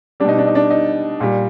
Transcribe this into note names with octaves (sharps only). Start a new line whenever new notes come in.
G3 D4
B2 D#4
D4
D#4
D4
D#4
A#2 G3